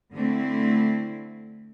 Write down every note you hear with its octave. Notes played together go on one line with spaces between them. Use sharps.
D3 A3 C4 E4